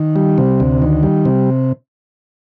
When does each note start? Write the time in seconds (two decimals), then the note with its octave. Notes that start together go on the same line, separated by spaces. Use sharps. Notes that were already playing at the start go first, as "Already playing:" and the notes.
Already playing: D#3
0.16 G3
0.38 C3
0.60 D2
0.82 D#3
1.03 G3
1.25 C3